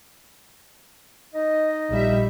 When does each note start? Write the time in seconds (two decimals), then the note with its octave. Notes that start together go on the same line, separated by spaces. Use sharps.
1.34 D#4 D#5
1.91 A#1 G3 E5